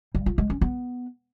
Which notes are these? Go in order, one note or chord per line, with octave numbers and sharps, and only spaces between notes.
G3
F4
G#3
C#4
B3